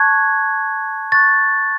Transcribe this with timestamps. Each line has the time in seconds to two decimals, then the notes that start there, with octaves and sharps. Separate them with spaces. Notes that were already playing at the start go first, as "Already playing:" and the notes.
Already playing: A5 C#6 F#6 G#6
1.12 C#6 F#6 A6